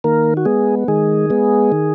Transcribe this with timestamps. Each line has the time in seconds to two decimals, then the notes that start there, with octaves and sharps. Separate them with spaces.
0.04 D#3 A#3 A#4
0.37 F#4
0.45 G#3 B3 G#4
0.88 D#3 G#3 G#4
1.30 G#3 B3
1.72 D#3